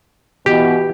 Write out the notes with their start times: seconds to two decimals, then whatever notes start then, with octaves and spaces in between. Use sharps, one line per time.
0.46 B2 E3 G4